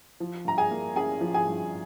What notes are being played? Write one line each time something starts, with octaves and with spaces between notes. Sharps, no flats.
F3
G2 A#5
G#4 G#5
A#3
C#4 G#4 G#5
F3
G#4 G#5
G2